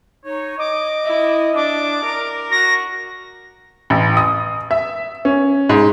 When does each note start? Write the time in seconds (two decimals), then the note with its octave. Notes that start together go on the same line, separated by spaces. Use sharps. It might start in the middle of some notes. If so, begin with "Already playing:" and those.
0.25 D#4 C#5
0.58 D#5 D6
1.05 E4
1.55 D4 D6
2.04 A#4
2.51 F#4 A#6
3.90 A1
4.17 D#6
4.71 E5
5.25 C#4
5.69 G#2